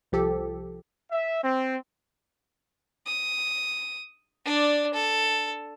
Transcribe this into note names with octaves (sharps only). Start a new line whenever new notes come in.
C2 F3 G4 A4
E5
C4
D#6
D4 D5
A4